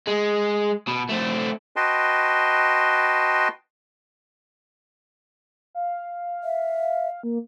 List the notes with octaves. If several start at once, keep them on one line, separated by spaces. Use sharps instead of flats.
G#3
B2
A3 C4
F#4 B4 D#5 G5 A5 C6
F5
E5
A#3